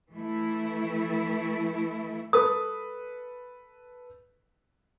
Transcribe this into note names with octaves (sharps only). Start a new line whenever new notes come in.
E3 A3 E4
A4 B4 D#6